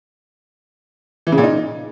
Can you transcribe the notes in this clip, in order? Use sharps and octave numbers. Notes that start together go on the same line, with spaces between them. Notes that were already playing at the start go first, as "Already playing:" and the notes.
E3
C#3
A#2
D#4